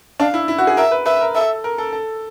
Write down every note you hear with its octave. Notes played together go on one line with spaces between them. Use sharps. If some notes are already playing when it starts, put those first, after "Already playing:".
D4 F5
E4
E4
F#4
G#4
A#4 E5
B4
B4 E5
A#4
A4 E5
A#4
A4
A4